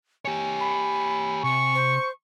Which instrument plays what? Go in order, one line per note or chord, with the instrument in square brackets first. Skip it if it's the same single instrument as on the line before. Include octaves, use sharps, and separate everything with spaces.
[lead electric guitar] G4 C#5 [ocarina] G#5
[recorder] B5
[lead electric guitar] C3 [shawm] C#6
[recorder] C5